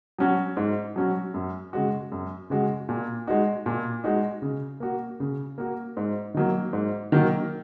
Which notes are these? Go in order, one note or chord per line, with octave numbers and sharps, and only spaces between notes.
F#3 C#4 F#4
G#2
F#3 C#4 F#4
F#2
C#3 G#3 F#4
F#2
C#3 G#3 F#4
A#2
G#3 D#4 F#4
A#2
G#3 D#4 F#4
C#3
A#3 F#4
C#3
A#3 F#4
G#2
D#3 F#3 A#3
G#2
D#3 F#3 A#3